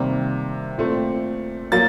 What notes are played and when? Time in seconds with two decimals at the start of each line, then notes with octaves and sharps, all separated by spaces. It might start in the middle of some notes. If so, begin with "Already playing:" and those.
Already playing: C3 D#3 G3 A#3
0.78 A#2 A3 C4
1.72 A#2 F#3 A#3 A6